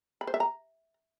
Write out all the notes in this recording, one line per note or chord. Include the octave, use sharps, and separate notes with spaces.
B5
C5
E5
A#5